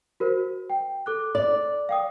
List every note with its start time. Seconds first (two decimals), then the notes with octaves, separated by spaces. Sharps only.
0.20 F#4 A#4 C5
0.70 G5
1.06 A4 D6 F#6
1.35 D5
1.89 F5 G5 D#6